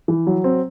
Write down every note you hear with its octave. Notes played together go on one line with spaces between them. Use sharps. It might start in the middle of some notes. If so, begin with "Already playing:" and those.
E3
F#3
C4